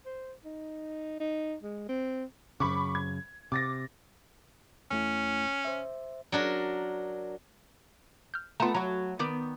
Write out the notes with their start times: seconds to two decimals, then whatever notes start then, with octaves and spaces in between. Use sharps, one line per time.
0.06 C5
0.45 D#4
1.20 D#4
1.63 G#3
1.89 C4
2.60 F#2 C#3 B5 C#6 D6
2.95 G#6
3.52 C3 D6 A6 A#6
4.91 E2 A3 C#4 E4
5.65 C5 E5
6.32 F#3 D4 A#4
8.34 F6 G6
8.60 A3 B3 F4 A5 A#5
8.75 F#3 F#4 A#5
9.19 D#3 B3 D5